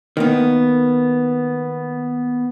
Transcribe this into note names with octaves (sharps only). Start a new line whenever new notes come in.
D#3 A#3 B3